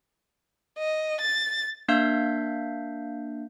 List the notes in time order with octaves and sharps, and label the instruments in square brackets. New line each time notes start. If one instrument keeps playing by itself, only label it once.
[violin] D#5
A6
[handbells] A#3 D4 E5 F5 G6